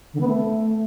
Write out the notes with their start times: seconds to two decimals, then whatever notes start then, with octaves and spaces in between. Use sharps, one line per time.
0.14 D3
0.21 B3
0.28 A3